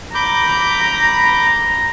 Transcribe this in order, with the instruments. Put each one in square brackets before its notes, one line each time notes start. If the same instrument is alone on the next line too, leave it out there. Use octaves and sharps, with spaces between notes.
[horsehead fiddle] A#5 [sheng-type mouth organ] B5 D6 G6